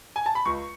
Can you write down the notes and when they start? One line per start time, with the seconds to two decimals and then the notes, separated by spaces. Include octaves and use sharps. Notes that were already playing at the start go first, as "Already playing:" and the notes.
0.16 G#5
0.26 A5
0.35 B5
0.46 C#2 C#6